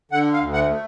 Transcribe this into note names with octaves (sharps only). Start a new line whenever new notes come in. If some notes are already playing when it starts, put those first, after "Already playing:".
D3 F#5
F5
D2
F#5
A3